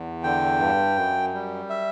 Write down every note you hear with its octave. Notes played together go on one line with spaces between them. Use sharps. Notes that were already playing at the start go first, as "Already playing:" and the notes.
Already playing: E2
D3 G5
G2
F#2
G3
E5